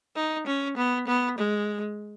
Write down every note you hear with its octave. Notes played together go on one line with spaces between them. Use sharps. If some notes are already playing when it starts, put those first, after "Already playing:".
D#4
C#4
B3
B3
G#3